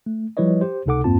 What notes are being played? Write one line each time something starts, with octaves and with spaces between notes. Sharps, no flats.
A3
F3 G3 E4 B4 C#5 D#5
G4 C5
C#2 C3 D#4 A4 F#5 D6
E2 G2 A#3 C4 F4 A5